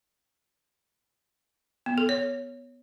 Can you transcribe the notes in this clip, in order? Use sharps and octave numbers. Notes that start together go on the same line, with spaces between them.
B3
A4
C#5